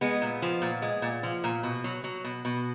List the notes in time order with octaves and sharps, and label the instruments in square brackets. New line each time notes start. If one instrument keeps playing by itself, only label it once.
[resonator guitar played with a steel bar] G#3 B3
A#2
F3
A#2
G#3
A#2
F3
A#2
B2
F#3
F#3
B2
B2